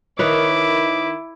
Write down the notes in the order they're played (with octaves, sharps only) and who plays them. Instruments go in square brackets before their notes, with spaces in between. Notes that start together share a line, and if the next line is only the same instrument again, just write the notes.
[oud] D#3 [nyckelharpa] E4 [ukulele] A#4 B4 C#5 [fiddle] D6